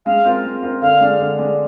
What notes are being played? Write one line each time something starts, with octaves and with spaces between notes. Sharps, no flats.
G#3 F5
C4 F4 A#4
G#3
C4 F4 A#4
D3 F5
G#3 D4
D3
G#3 D4